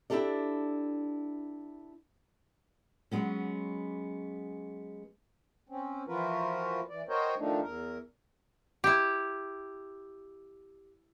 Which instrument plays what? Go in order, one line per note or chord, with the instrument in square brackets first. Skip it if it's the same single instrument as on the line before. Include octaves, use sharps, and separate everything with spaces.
[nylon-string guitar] D4 E4 F4 G4 A4 D5
[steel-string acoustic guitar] F#3 G#3 B3 C#4
[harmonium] C4 C#4
E3 F3 F4 F#4 A#4 B4
E3 D5
F#4 A#4 C5 C#5 D#5 G5
D#3 F3 A3 D4 D#4
E2 A#4
[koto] E4 G4